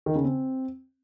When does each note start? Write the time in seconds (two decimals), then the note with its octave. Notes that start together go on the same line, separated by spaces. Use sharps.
0.06 D#3
0.15 C#3
0.24 C4